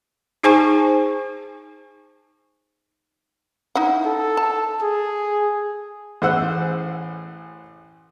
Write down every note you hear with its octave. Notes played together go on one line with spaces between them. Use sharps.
D#4 G#4 C5 G#5 A5 C#6
D#4 E4 F#5
A4
A5
G#4
A1 G#4 C5 F#5 E6 F#6